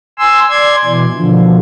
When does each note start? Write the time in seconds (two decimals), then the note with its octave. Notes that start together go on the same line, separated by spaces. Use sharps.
0.18 G#5 C6 E6
0.50 D5 C6 G#6
0.85 B2 E3
1.15 B2 D3 F3